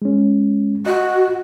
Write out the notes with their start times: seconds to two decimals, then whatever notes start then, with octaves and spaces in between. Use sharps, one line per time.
0.02 G#3 C#4
0.86 F#4 D#5